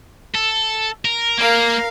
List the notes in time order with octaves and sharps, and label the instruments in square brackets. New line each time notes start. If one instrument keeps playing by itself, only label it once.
[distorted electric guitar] A4
A#4
[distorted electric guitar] A#3 [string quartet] A#4 F5